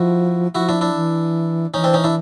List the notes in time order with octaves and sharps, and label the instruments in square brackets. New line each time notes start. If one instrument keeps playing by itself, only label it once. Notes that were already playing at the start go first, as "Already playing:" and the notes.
Already playing: [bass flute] F3 [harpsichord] E4 F#4
[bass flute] F3 [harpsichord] E4 F#4
[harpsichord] D4 E4
D4 E4
[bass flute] E3
[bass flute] E3 [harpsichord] C#4 D#4
[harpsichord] C4 D4
C#4 D#4
D4 E4